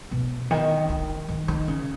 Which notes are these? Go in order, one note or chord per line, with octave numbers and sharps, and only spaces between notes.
B2
D#3
D#3
D#3
D#3
C#3